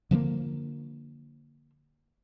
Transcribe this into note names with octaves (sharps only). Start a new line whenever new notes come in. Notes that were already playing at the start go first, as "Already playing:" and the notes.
D3 F3 G#3 A#3